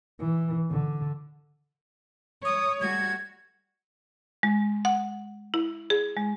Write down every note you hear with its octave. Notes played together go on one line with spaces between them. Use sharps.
E3
D3
C#5 D#6
G3 A3 F#4 G#6
G#3
F#5
E4
G#4
G#3